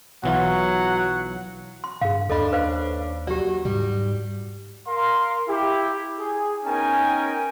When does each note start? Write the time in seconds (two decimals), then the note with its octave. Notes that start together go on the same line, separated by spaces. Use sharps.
0.24 B1 E3 F#3 F4 F#5
1.84 C6
2.01 G2 G#4 F5
2.30 D#2 C#4 D4 A4 D#5 B5
2.52 B4 C5 F5
3.27 F#3 F#4 G4 D5
3.65 G#2 G3
4.87 A#4 F5 C6
5.48 E4 G4
6.18 G#4
6.65 B3 C#4 D#4 A#4 G5 G#5